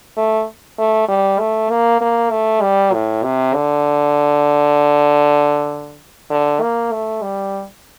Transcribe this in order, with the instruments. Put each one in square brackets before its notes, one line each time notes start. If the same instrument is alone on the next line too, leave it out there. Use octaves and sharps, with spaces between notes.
[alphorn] A3
A3
G3
A3
A#3
A#3
A3
G3
A2
C3
D3
D3
A#3
A3
G3